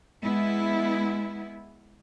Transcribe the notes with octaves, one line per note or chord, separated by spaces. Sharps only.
G#3 B3 E4